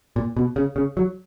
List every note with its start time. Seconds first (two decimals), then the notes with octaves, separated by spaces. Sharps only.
0.16 A#2
0.37 B2
0.56 C#3
0.76 C#3
0.97 F#3